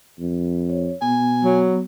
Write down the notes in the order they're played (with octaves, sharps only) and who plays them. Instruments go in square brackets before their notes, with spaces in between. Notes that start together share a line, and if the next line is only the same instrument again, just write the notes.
[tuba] F2
[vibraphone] C#5
[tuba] B2 [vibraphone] B3 [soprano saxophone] G#5
[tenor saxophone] F#3